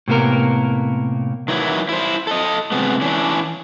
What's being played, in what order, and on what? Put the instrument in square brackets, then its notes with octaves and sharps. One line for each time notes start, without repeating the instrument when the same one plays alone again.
[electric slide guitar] A2 C3 A#3 B3 A#4
D#3 E3 F#3 E4
E4 C5
A4 D#5
C3 G#3 A3 B3
E3 C#4 D4